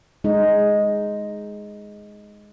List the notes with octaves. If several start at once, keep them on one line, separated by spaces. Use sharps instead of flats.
G#3 D#4